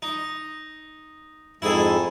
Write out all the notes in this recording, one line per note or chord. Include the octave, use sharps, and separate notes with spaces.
D#4
F2 G#2 E4 G#4 A4